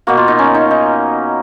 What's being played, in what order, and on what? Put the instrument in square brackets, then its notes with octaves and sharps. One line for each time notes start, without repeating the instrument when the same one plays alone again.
[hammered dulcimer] B2 A#3 F#4
F4
D#4
C#4
D#4
D#4